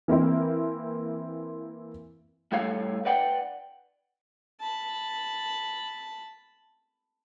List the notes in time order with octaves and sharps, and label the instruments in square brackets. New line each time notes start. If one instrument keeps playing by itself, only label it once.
[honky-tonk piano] E3 A#3 C4 E4
[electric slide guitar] A2 G3 A4 C#5 F5
B4 D5 F#5 G5
[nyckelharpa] A5 B5